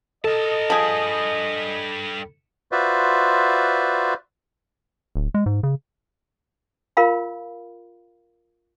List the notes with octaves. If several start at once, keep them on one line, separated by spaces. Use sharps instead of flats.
A4 A#4 D#5 A5
F3 G3 D4 G#4
F4 F#4 B4 C5 D5 E5
D1
G#3
G#2
C#3
F4 A#4 F5 B5